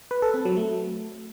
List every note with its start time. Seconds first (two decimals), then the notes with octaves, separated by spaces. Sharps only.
0.11 B4
0.22 A4
0.34 C4
0.45 F#3
0.57 A3